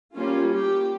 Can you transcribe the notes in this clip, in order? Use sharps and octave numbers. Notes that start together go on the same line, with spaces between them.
G3 A#3 C#4 F4
G4